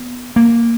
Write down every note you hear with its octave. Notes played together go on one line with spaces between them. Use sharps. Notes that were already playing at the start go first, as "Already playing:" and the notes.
Already playing: B3
A#3